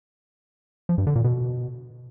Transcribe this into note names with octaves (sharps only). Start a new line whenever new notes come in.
F3
G2
D3
A#2
B2